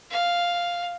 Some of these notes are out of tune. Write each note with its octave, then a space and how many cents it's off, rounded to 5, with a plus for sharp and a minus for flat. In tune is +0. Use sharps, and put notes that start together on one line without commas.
F5 +0